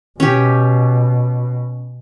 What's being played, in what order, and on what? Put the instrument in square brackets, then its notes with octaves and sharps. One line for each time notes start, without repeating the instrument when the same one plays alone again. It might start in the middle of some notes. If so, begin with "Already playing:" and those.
[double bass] B2 [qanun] C#4 G4